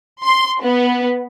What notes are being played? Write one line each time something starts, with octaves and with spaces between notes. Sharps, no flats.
C6
B3